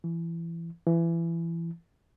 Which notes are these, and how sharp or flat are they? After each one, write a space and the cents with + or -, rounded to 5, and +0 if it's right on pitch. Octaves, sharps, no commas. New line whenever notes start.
E3 +25
E3 +25